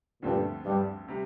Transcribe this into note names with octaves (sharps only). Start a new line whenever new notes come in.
D2 G2 A#2 D3 F3 A3 C4
G2
C3 G3